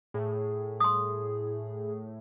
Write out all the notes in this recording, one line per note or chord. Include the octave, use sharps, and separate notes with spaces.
A2 G#4
C6 D#6